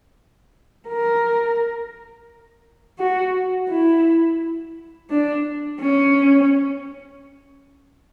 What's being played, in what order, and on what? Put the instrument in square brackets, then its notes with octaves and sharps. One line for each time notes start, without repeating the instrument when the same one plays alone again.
[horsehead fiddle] A#4
F#4
E4
D4
C#4